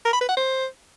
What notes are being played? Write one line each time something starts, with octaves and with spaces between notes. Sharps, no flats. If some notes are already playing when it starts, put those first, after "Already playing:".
A#4
B5
B4
F#5
C5